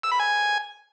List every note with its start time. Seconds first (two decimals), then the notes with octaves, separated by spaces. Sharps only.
0.03 E6
0.12 B5
0.20 G#5